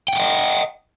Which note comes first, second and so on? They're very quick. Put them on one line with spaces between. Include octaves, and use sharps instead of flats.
G5 F#5 E5 D#5